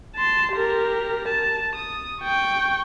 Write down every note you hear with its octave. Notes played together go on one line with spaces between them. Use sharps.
A5 C6
G4 A#4
A5
D#6
G5 C#6